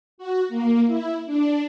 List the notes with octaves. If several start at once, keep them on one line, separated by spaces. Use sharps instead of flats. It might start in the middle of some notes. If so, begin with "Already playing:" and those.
F#4
A#3
E4
D4